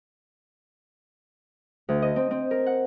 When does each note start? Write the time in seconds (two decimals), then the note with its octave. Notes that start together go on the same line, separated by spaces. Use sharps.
1.89 D2
2.02 D#5
2.16 C4
2.31 C4
2.51 A#4
2.66 F#5